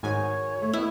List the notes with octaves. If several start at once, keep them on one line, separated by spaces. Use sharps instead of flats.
G#2 D#3 F#4 C#5 G#5
A3
B3 E4 D#5